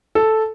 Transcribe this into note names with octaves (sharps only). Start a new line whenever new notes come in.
A4